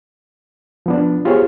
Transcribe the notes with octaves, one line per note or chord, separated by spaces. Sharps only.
F3 B3 D4
B3 F4 G4 G#4 C5 C#5